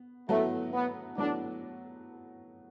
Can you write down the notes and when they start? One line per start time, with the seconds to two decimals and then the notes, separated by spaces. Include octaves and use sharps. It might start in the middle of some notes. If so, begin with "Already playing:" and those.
Already playing: B3
0.28 A2 F#3 A3 B3 F#4 A4
0.73 B3
1.18 A2 F#3 B3 D4 F#4 A4